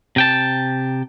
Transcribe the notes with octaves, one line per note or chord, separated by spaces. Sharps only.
C3 G5 A5